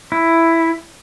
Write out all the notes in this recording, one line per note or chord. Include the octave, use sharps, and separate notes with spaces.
E4